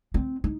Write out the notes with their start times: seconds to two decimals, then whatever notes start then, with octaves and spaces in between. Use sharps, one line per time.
0.14 C4
0.44 D#4